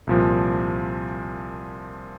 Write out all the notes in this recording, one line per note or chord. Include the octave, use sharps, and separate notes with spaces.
C2 A#2 F3